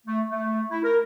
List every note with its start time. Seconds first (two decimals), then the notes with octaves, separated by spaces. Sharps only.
0.06 A3
0.30 A3
0.71 E4
0.83 A#4